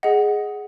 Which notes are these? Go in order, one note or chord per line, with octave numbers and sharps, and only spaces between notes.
G#4 D#5 F#5